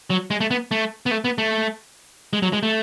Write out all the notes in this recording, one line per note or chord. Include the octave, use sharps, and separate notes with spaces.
F#3
G#3
A3
B3
A3
B3
A3
B3
A3
G#3
F#3
G#3
A3